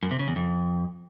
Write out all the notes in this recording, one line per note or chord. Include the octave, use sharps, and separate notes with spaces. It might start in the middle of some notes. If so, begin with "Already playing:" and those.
F#2
C3
C#3
E2
F2